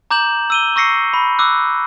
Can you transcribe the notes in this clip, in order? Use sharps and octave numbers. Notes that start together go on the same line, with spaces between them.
A#5 D6 G6 E7 F#7
E6 D#7 G7
C#6 E6 A#6 C7 C#7
B5
D6 E6 F#6